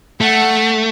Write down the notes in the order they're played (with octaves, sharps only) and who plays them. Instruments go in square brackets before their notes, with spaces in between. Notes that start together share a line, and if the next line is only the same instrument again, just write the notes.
[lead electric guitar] A3 [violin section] F#5 A5